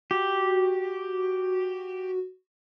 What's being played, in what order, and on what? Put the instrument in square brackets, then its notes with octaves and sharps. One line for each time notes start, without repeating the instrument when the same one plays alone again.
[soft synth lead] F#4 [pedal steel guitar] G4